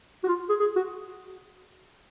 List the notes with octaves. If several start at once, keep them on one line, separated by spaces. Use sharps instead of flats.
F#4
F4
G#4
G#4
F#4